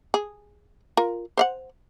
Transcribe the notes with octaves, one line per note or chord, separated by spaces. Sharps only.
G#4
F4 A#4
C5 F5 F#5